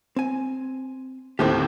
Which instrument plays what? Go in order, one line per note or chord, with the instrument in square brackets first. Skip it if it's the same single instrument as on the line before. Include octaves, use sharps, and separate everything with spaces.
[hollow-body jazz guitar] C4 G#5
[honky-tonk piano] D#2 A2 C4 [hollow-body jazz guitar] D3 A#3 G4